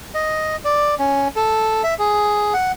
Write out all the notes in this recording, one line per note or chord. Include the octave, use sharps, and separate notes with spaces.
D#5
D5
C#4
A4
E5
G#4
F#5